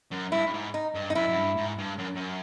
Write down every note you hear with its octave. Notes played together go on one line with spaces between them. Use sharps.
F#2
G2 E4
G2
G#2
D#4
G2
D#4
F#2 E4
F#2
G2
G#2
G2
F#2
F#2